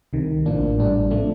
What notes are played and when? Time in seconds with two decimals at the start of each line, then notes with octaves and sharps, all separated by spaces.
0.13 C2 C3 D#3
0.46 A1 A2 F3 A#3 D4
0.79 A1 A2 G3 D4
1.10 C3 F3 A3 D4